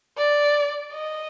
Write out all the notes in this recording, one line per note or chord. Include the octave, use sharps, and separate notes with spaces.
D5
D#5